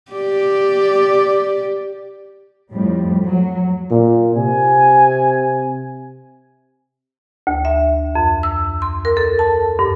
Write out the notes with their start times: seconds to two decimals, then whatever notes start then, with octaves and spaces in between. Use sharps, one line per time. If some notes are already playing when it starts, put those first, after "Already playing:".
0.12 G4 D5
2.71 F2 A2 G3
3.24 F#3
3.91 A#2
4.35 C3 G#5
7.47 D2
7.65 E5
8.15 F2
8.43 E6
8.82 C6
9.05 A#4
9.17 A4
9.39 A5
9.79 G2